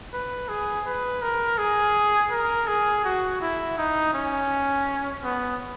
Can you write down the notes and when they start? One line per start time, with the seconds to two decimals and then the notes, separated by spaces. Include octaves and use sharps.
0.13 B4
0.48 G#4
0.86 B4
1.22 A#4
1.58 G#4
2.31 A#4
2.67 G#4
3.04 F#4
3.41 E4
3.78 D#4
4.13 C#4
5.23 B3